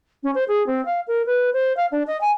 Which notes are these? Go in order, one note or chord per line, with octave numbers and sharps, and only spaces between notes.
C#4
C5
G#4
C4
F5
A#4
B4
C5
F5
D4
D#5
G#5